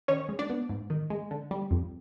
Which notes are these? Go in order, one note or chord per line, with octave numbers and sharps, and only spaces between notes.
D#3 C#4 C#5
G#3
D4 D5
B3
G#2
D#3
G#3
D3
G3
F2